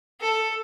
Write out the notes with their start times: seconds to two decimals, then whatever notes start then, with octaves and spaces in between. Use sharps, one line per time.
0.21 A4